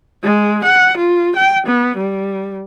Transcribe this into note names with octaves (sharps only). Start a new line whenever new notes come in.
G#3
F#5
F4
G5
B3
G3